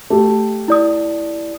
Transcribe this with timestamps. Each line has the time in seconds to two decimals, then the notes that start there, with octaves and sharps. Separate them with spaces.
0.10 A3 G4
0.68 E4 D5 D#6